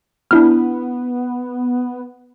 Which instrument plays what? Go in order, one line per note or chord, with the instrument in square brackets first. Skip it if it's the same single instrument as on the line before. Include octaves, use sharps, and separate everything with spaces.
[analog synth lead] B3 [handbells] D4 E4 F6